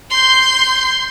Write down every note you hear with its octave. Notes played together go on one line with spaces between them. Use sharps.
C6 G6